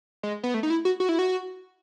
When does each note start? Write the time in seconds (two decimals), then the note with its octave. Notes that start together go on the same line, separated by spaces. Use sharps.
0.23 G#3
0.43 B3
0.54 A3
0.63 D#4
0.70 E4
0.85 F#4
1.00 F#4
1.09 E4
1.19 F#4